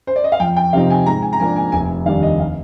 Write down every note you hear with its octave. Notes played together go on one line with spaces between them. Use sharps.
C5
D5
D#5
F5
F2 G5
G5
C3 F3 C4 D#4 F5
G#5
G#2 A#5
G#5
A#5
F3 A#3 D4 G#5
G#5
F1 G#5
D#2 D#3 G3 D4 F5
D#5
F5